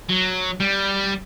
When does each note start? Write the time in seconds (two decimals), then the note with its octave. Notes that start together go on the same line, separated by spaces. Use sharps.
0.09 F#3
0.60 G3